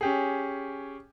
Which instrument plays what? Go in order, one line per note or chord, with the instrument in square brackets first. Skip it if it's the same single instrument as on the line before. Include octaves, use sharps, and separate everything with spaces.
[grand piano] C#4 G4 G#4